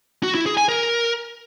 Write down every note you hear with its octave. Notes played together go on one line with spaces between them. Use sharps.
F#4
E4
G#4
G#5
A#4